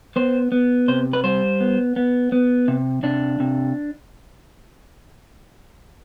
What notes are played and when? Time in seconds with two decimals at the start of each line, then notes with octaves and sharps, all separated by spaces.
0.16 B3 C5
0.52 B3
0.88 C3 C5
1.13 B4
1.24 G3 C5
1.60 B3
1.96 B3
2.32 B3
2.68 C3
3.03 C3 D4
3.40 C3